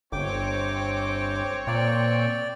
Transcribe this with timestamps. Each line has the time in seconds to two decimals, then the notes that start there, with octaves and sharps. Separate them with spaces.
0.12 G1 C4 C#5 G5 D6
1.67 A#2 D5 G5